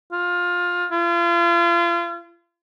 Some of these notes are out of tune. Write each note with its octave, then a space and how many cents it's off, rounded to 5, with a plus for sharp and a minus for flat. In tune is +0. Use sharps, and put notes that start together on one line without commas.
F4 +20
F4 -35